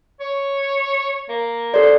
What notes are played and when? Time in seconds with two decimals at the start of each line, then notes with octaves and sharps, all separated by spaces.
0.20 C#5
1.29 A#3
1.74 A4 C5 D5